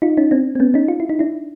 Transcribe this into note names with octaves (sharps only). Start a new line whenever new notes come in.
D#4 F4
C#4 D#4
C4 D4
C4
B3 C#4
C#4 D#4
F4
E4
D#4
D4 E4